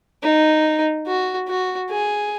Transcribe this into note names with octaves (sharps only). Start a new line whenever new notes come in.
D#4
F#4
F#4
G#4